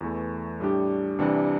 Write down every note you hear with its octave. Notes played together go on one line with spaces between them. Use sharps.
E2 E3 A3
A2 G3 D4 G4
C2 C3 E3 G3 D4